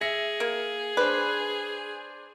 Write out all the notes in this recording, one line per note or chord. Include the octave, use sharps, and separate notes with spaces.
G#4 E5 A#6 C#7
A#3
D4 B4 C5